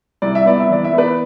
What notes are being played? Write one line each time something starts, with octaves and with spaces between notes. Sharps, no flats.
C2 D5
E5
B3 D5
E5
E3 D5
E5
B3 B4 D5